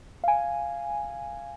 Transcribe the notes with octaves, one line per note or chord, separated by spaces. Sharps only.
F5 G#5